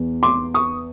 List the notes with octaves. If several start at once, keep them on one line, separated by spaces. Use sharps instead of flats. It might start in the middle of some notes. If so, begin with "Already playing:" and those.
Already playing: E2
C6 D6
C#6 D#6